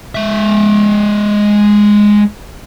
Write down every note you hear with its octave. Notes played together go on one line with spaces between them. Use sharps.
G#3 E5